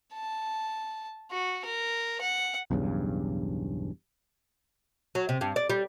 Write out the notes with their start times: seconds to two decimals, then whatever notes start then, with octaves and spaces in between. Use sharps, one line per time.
0.13 A5
1.31 F#4
1.65 A#4
2.21 F#5
2.71 B1 E2 G2 C#3
5.15 F#3
5.29 C3
5.41 G2
5.56 D5
5.70 G3